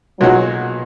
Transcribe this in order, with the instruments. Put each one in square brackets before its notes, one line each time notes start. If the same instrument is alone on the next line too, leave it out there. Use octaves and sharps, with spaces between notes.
[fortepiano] B1 A#2 G#3 D#4 F#4 [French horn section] F#3